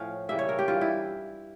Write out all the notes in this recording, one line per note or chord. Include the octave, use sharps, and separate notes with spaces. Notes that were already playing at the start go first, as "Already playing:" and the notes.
Already playing: A2 F3 C#4 F5
C#3 E3 G3 A#3 E5
C#5
A#4
G4
G2 E3 G3 F4
E4